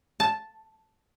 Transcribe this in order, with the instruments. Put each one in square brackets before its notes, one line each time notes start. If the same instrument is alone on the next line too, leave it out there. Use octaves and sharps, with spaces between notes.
[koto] A5